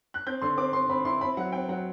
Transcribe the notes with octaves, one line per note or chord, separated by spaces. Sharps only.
F#6
C4 G6
D3 C6
C4 D6
C4 C6
C4 B5
E4 C6
C4 B5
F#3 F#5
C4 G5
F#3 F#5